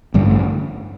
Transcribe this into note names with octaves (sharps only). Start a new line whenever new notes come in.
A1 G2 D3 G3
A3